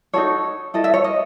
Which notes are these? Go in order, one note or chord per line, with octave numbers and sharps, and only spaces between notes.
D#4 F#4 A4 C#5
E4 A4 D#5
E5
C#5
D#5